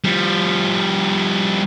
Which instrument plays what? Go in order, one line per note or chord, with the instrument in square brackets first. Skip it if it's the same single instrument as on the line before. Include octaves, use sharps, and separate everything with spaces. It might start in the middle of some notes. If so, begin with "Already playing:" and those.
[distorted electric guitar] F3 G3